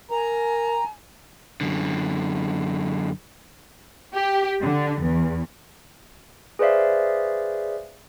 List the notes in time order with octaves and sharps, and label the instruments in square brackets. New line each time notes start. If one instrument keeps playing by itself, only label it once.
[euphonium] A#4 [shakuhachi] G#5 [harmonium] A#5
[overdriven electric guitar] F#2 D3
[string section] G4
D3
E2
[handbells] G#4 B4 C5 D5 E5 F5